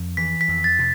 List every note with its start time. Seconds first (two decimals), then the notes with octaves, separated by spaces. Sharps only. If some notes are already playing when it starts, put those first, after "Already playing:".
Already playing: F2
0.17 E3 B6
0.41 B6
0.48 F2
0.64 A6
0.79 C3